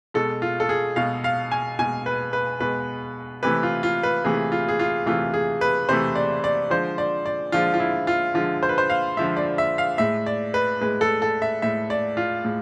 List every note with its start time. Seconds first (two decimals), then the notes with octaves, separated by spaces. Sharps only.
0.14 B2 G#3 A4
0.42 F4
0.60 A4
0.69 G#4
0.96 B2 G#3 F5
1.24 F5
1.51 G#5
1.79 B2 G#3 G#5
2.06 B4
2.33 B4
2.60 B2 G#3 B4
3.43 C3 E3 A3 B4
3.63 F4
3.83 F4
4.03 B4
4.24 C3 E3 A3 G#4
4.52 F4
4.68 G#4
4.79 F4
5.06 C3 E3 A3 F4
5.34 G#4
5.61 B4
5.89 C3 E3 A3 C5
6.16 D5
6.44 D5
6.70 D3 F3 G#3 C5
6.98 D5
7.26 D5
7.52 D3 F3 G#3 F4
7.74 F4
7.80 E4
8.07 F4
8.34 D3 F3 G#3 F4
8.63 C5
8.69 B4
8.78 C5
8.90 F5
9.17 D3 F3 G#3 E5
9.37 D5
9.58 E5
9.78 F5
9.98 A2 G#3 E5
10.26 D5
10.54 B4
10.81 A2 G#3 B4
11.01 A4
11.22 A4
11.42 E5
11.62 A2 G#3 E5
11.90 D5
12.17 F4
12.45 A2 G#3